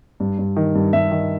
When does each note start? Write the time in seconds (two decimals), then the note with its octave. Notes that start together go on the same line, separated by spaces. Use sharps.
0.20 G2
0.38 G2
0.56 D#3
0.75 G2
0.93 G2 E5
1.12 D#3